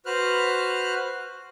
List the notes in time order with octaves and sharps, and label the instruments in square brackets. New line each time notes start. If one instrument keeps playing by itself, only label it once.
[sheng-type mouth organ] F#4 B4 C5 F6 F#6